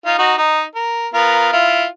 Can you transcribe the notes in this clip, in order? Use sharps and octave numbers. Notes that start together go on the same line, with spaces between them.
D#4 F4
D#4 F#4
D#4
A#4
B3 F4 A#4
E4 F4